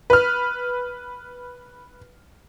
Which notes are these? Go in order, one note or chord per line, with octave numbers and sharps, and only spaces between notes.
B4 F6